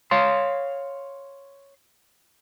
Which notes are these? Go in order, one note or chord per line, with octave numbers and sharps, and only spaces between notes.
C#5 F5 C6